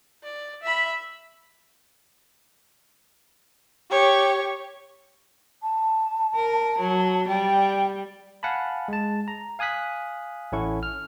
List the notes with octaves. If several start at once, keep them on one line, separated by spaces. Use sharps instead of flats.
D5
E5 B5
G4 C#5
A5
A#4
F#3
G3 G5
F5 F#5 G#5 A5 B5
G#3 A5
A#5
F5 G#5 D#6 F#6 B6
A1 C#4 E4 A4 F#5 C#6
F6